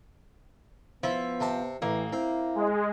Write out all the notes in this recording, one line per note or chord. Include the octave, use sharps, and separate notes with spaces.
F3 B3 E4
C3 A5
A1 E3 A#3
C4 E4
G#3